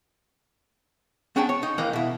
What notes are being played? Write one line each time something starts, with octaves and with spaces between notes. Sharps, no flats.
B3 C#4 D4 G#4 G5 A5
C#5
D#4
D#2 E3 G#3 A#3 D#5
B2 E4